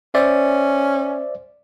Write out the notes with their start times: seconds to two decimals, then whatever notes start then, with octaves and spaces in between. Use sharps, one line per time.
0.14 C#4 C5 D5 E5